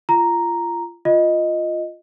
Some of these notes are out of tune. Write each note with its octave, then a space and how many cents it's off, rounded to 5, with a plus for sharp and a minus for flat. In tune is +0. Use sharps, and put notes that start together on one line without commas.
F4 -25 A#5 +0
F4 +0 D#5 +0